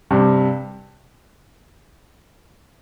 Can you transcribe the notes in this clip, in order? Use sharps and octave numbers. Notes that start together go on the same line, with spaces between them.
G2 C3